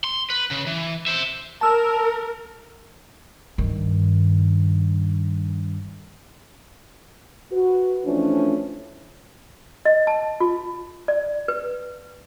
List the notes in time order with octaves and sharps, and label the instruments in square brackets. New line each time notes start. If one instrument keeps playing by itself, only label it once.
[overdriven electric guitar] C6
B4
C#3
E3
C5 E5
[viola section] A#4 [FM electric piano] A5 E6
[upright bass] G2 D#3
[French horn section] F#4 B4
E3 F3 A3 C#4 D4
[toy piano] D#5
A5
F4
D5
B4